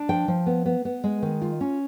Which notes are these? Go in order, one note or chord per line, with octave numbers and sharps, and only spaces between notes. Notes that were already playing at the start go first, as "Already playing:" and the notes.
Already playing: D4
F3 G5
F3
B3
B3
B3
G#3
D#3
F4
C#4